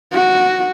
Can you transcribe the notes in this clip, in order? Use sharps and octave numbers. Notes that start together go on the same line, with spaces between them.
F#4